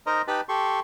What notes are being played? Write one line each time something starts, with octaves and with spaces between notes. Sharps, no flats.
D#4 A#4 C5 D#5 A#5
D#4 G4 B4 A5 B5
G4 A4 C6 C#6